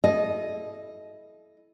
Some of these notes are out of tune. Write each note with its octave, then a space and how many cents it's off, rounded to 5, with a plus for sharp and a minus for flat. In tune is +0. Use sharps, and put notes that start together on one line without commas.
E4 +0 A4 -35 D#5 +0